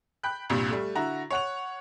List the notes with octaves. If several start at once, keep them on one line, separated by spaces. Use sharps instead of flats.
G5 B5 F#6
C2 G2 A#2 G3
G3 A3
D3 E4 F#4 A#5
C#5 F#5 F7